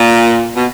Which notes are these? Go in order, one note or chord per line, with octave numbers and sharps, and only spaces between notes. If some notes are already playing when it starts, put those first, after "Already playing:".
Already playing: A#2
B2